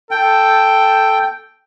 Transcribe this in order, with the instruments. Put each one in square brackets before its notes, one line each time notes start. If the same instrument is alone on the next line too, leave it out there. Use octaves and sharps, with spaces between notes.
[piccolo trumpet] A4 [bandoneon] G5